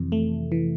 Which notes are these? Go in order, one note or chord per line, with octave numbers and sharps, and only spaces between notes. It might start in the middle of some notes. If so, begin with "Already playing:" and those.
Already playing: F2 C3 E3
A3
E3